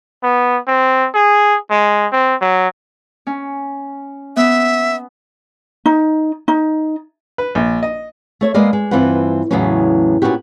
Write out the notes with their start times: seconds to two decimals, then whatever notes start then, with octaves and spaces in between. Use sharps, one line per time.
0.23 B3
0.67 C4
1.14 G#4
1.70 G#3
2.12 C4
2.41 F#3
3.27 C#4
4.36 B3 E5
5.86 D#4
6.48 D#4
7.38 B4
7.55 A#1
7.83 D#5
8.41 A3 C#5 E5
8.54 G#3 A#3 B3 D5 D#5 F5
8.73 G#3
8.91 G2 E3 C4 F4 B4 F#5
9.51 E2 A2 C#3 F#3 B3 C#4
10.22 A#2 A3 B3 C#4 F#4 G4